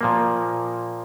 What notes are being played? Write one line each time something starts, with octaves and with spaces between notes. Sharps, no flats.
A#2 F3 A#3